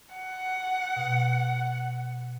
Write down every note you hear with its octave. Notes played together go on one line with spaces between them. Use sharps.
F#5
B2